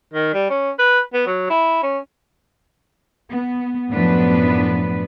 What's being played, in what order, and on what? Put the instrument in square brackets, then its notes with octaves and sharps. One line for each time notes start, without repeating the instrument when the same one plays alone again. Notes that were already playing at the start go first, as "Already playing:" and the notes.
[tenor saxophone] D#3
G3
C#4
B4
B3
F#3
E4
C#4
[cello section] B3
F#2 A2 F3 B3 D4 B4